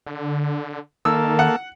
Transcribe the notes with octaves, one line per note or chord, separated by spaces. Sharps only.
D3
D#3 A#3 A4 E6
F#5